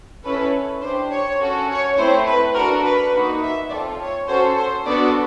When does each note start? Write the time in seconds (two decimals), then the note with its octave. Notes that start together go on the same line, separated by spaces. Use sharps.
0.25 C#4 E4 A4 B4
0.82 D4 G4 C5
1.12 C#5
1.40 C#4 F#4 A4
1.69 C#5
1.98 A3 C4 E4 C5
2.27 B4
2.55 D4 F#4 A4 A#4
2.84 B4
3.13 A#3 D#4 F#4
3.42 E5
3.71 C4 F4 A4 D5
3.99 C#5
4.28 C#4 F#4 A4 C5
4.57 C5
4.86 B3 D4 F#4 A4 D5